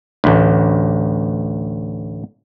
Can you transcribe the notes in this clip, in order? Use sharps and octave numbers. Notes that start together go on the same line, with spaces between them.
A1 D2